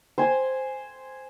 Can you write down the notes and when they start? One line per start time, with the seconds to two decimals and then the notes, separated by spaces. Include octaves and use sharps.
0.18 C5 G#5